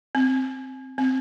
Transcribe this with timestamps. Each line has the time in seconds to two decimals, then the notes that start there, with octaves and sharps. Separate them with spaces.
0.15 C4
0.98 C4